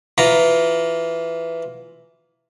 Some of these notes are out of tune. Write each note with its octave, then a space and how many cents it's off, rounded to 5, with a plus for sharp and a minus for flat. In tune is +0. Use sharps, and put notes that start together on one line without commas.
E3 +10 F4 +15 A#5 +0